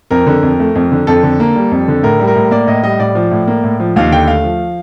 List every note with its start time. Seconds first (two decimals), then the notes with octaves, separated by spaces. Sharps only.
0.11 F2 A#4
0.27 D3
0.43 F2
0.60 A3
0.75 F2
0.92 D3
1.07 F2 A4
1.23 D3
1.40 A#3
1.56 G3
1.71 F2
1.88 D3
2.03 A2 A#4
2.20 G3
2.28 A#4
2.36 A2
2.51 A#3 D5
2.67 A2 D#5
2.83 G3 D#5
2.99 A2 D5
3.15 F3
3.31 A2
3.47 A#3
3.64 A2
3.80 F3
3.96 D#2 F5
4.12 D3 G5
4.28 A3 F5
4.44 F3